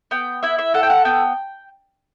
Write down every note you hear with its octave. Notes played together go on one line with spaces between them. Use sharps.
B3 G5
E4 E5
E5
A4 F#5
G5
F#5
B3 G5